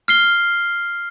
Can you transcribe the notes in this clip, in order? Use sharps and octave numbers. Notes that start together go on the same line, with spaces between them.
F6 C7 G7